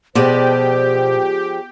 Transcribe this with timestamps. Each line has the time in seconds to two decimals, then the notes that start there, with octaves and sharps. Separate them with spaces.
0.15 B2 F3 G#3 G4 C5 D5